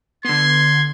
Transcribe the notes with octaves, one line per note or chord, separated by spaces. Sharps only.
D3 B3 C6 G#6